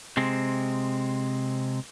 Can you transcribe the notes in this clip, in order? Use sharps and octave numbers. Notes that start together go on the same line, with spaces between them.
C3 G#3 C4